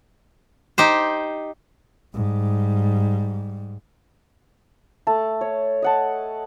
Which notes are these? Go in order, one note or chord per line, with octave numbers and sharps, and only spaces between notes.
D#4 G4 C5
G#2 G3
A3 A5
C#5
D#5 F#5 A5